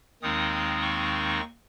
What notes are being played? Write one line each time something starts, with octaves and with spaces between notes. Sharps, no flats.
D#2 D#3 G#3 C4 D#4 D#6
D#6
C#6